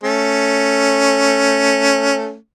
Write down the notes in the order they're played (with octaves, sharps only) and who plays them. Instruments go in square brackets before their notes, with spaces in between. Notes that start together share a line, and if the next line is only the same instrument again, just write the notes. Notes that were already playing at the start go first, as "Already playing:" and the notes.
[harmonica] A3 C#4